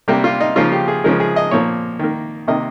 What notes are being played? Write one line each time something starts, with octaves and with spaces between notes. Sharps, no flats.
C3 G3 A#3 G4
F4
D#4
C#3 F3 A#3 F4
G4
G#4
C#3 F3 G#3 A#4
G#4
D#5
A#2 F3 A#3 C#5
D#3 A#3
C3 D#3 A#3 D#5